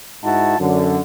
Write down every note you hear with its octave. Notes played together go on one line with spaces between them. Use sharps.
G#2 D#4 E4 F#4 A5
F#2 D3